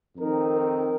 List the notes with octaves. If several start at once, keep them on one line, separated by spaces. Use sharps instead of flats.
F2 D#3 C4 D#4 A#4
A#4